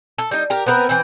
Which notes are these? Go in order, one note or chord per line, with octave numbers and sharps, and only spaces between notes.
A4
G3 D#4
G4 A#4
B3 C4 A#4 B4
E3 C4